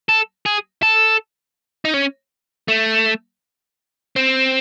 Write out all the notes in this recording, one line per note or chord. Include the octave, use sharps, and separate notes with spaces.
A4
G#4
A4
D#4
C#4
A3
C4